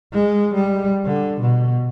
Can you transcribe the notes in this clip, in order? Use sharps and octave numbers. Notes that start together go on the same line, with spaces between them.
G#3
G3
D3
B2